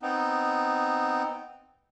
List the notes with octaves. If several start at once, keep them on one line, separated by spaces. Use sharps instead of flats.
B3 C4 D#4